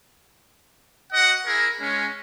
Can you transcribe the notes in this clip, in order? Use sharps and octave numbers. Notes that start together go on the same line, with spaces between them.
F#4 D#5 F#5
E4 G#4 A#4
G#3 C#4